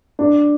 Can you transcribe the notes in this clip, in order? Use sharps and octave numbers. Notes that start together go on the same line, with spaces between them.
D4